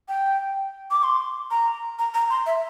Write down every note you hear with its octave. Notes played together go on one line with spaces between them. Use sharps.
G5
D6
C6
A#5
A#5
A#5
C6
E5